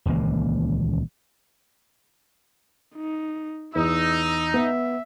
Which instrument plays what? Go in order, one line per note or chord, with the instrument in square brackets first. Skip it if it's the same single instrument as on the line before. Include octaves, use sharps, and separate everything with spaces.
[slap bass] D#1 C#2 E3 A#3
[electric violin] D#4
[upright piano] E2 [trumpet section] D#4 [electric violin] E6
[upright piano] B3 [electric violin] E5